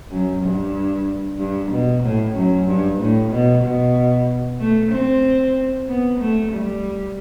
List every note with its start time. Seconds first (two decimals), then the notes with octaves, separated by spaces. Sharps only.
0.11 F#2
0.43 G2
1.38 G2
1.70 B2
2.04 A2
2.35 F#2
2.67 G2
2.99 A2
3.31 B2
3.63 B2
4.60 A3
4.91 C4
5.88 B3
6.20 A3
6.53 G3